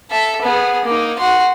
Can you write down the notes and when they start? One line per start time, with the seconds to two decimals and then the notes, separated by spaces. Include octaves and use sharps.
0.11 A4 E5
0.42 B3 G#4
0.85 A#3 D#4
1.18 F#4 C6